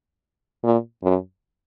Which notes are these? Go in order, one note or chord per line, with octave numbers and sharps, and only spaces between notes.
A#2
F#2